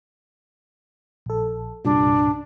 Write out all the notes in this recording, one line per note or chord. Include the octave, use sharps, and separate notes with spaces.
A#1 A4
C2 G2 A#2 D4